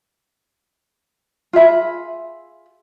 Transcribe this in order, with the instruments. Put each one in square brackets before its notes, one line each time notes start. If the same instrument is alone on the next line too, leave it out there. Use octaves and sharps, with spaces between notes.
[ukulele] F4 G#4 E5 B5